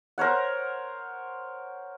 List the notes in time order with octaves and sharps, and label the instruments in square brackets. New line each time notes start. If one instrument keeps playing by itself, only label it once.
[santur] A#4 C5 C#5 F#5